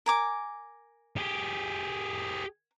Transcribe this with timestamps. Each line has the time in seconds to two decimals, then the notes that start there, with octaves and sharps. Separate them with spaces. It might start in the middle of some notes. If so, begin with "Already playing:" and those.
0.06 A#4 G#5 D6
1.17 G4 G#4